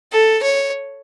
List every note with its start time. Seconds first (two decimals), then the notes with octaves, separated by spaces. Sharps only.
0.12 A4
0.43 C#5